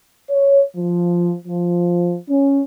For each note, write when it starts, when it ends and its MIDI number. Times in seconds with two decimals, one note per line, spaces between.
0.30 0.62 73
0.76 1.34 53
1.45 2.15 53
2.29 2.60 61